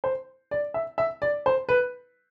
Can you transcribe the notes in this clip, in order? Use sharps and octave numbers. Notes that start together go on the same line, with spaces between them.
C5
D5
E5
E5
D5
C5
B4